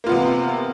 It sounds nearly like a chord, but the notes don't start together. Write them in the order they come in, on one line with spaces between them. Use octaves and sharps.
A#3 F4 B3 C3